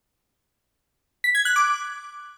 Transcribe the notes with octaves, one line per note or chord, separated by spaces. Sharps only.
B6
G#6
F#6
D6